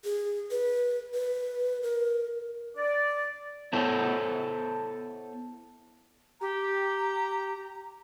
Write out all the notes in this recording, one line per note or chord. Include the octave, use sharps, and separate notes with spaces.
G#4
B4
B4
A#4
D5
B3 E4 A4 C5 C#5
G4 A#5